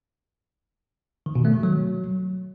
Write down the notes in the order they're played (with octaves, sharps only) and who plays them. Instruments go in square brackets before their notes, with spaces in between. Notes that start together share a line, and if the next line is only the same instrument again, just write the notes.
[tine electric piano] D#3
B2
A3
D#3
F#3